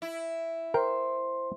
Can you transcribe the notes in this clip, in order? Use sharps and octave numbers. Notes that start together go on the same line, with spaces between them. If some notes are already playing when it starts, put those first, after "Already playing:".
E4
A#4 C5 G5 C6